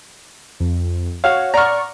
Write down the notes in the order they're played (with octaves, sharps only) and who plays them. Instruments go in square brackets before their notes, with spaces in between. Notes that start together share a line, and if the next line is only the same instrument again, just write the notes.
[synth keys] F2
[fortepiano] F#4 F5 [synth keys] C#5
[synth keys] D5 F#5 C#6 [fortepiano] A#5 F6